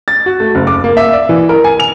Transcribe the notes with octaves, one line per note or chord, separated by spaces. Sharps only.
A6
F#4
A3
F#1
D6
A#3
E5
D5
E3
A#4
G#5
F7